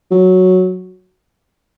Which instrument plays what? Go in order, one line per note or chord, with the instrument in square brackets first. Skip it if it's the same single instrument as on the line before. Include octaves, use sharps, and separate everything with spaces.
[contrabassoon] F#3